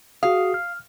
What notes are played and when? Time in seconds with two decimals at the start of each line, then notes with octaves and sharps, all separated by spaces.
0.23 F#4 G#4 F5 D#6
0.54 F6